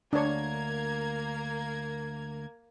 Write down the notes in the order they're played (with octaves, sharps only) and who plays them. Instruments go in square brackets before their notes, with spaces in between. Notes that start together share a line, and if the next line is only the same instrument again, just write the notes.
[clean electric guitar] D2 [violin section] A#3 G#6 [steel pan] D4 C#5